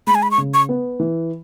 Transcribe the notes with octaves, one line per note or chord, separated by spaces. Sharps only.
G#3 B5
G#5
B5
C#6
C#3
C#6
B3
E3